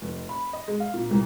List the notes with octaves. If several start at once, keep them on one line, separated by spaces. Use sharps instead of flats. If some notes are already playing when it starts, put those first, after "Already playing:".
F1
B5
D#5
G#3
F5
A#2
C2